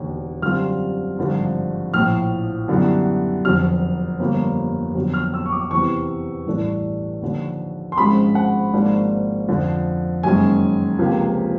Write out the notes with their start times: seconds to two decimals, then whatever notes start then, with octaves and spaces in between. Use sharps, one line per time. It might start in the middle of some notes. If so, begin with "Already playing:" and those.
Already playing: E1 D#2 D3
0.42 F#2 D3 G3 C4 F4 F6
1.18 G#1 G2 D3 F3
1.94 A#1 A2 F3 F6
2.68 F#2 D3 G3 B3 E4
3.44 F1 F2 D3 F#3 F6
4.19 G1 G2 D3 F3 A#3
4.95 G1 F2 D3 F#3
5.14 F6
5.34 E6
5.46 C#6
5.52 D6
5.71 E2 C3 E3 C#6
6.47 A1 G2 E3 A3 D4
7.22 D#2 D3 F3
7.92 C6
7.98 G#1 G#2 F3 G#3 C#4 B5
8.35 F#5
8.73 G#1 G#2 F3 A#3 D4
9.48 F2 D3 F3
10.23 F#1 F#2 D#3 G#3 C#4 G#5
10.99 C#2 C3 F3 A#3